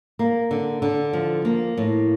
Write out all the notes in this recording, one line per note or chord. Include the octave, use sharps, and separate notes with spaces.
A#3
D3
D3
F3
A#3
A2